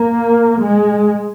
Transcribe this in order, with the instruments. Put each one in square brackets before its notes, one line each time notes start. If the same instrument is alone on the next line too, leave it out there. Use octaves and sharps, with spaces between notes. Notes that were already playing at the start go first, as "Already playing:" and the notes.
Already playing: [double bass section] A#3
G#3